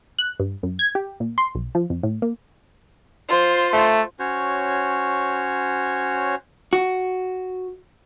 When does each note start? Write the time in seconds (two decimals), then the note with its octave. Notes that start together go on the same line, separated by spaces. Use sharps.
0.19 F#6
0.40 G2
0.63 F#2
0.79 G#6
0.95 G4
1.20 A#2
1.38 C6
1.55 B1
1.75 F3
1.90 F2
2.03 A2
2.22 A#3
3.28 F4 C5
3.73 A3
4.19 C#4 F#4 C5 C#5
6.73 F#4